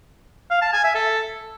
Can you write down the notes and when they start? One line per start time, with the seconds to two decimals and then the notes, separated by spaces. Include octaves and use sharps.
0.50 F5
0.62 A5
0.73 G#5
0.84 E5
0.95 A4